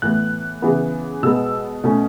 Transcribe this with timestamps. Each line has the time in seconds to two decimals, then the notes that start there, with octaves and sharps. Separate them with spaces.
0.02 A2 E3 B3 F#6
0.62 C#3 E3 B3
1.23 B2 G#3 B3 E6
1.84 B2 A3 C#4